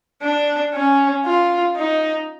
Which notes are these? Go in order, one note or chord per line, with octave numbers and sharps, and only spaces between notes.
D4
C#4
F4
D#4